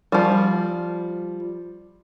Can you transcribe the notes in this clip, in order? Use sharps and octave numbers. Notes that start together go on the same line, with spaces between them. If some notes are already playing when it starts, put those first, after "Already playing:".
F3 G3